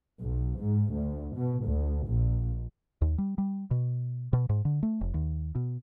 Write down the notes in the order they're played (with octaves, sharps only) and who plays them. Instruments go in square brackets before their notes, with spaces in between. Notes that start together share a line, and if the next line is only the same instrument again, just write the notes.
[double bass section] B1
G#2
D2
B2
D2
A#1
[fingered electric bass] D#2
G3
G3
B2
B2
G#2
D3
A3
F1
D#2
B2